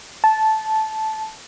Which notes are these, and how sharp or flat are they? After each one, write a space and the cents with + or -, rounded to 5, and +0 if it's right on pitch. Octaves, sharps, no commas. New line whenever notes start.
A5 -10